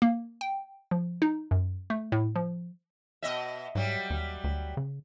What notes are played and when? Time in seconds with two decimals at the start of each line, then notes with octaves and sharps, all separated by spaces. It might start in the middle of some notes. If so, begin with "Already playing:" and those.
0.02 A#3
0.41 G5
0.91 F3
1.22 D#4
1.51 F#2
1.90 A3
2.12 A2
2.35 F3
3.22 B2 D#5 E5
3.75 G#2 F#3 G3
4.10 D#2
4.44 D2
4.77 C#3